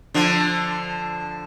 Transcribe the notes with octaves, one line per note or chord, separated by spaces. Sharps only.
D3 F3